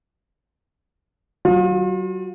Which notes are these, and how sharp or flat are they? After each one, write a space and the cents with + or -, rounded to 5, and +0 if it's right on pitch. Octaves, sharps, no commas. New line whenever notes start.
F#3 +25 F4 +40